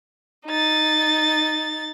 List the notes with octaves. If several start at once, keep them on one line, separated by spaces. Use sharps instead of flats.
D#4 A6